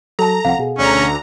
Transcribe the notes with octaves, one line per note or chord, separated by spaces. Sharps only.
F#3 A4 A5 A#5
C2 F3 C4 F5 F#5
B2 G#4
D2 D3 C#4 A#5